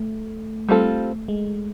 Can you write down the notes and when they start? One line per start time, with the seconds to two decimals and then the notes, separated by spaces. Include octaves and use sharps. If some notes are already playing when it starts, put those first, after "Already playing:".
Already playing: A3
0.69 G3 A3 C4 F4 A4
1.28 G#3